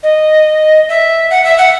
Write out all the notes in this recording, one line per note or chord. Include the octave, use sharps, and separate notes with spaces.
D#5
E5
F#5
E5
F#5